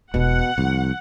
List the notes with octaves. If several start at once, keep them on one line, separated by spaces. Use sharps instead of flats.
E1 B2 D4 F#5
C2 F3